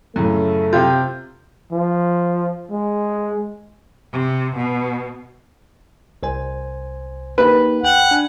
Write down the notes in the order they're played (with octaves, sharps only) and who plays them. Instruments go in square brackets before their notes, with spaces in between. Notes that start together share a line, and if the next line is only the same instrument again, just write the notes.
[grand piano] F#2 A2 C#3 [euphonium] A3
[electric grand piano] C3 G5 G6 [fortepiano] F4
[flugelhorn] F3
G#3
[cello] C3
B2
[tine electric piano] C2 C5 G#5
[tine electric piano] A#3 D#4 G4 [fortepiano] B4
[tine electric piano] D2 G5 [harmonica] F#5
[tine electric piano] D4 G#5 F#6